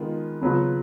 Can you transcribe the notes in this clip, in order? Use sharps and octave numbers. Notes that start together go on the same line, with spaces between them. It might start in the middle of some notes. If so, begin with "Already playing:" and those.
Already playing: D#3 G#3 B3 F4
C#3 F#3 B3 F4 B4